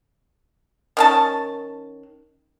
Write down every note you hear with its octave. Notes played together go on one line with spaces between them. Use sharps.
D#3 C#4 A5